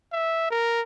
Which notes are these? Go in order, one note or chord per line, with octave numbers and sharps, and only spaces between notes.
E5
A#4